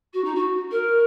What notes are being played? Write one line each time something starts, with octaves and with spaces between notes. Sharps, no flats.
F#4
D#4
F#4
A#4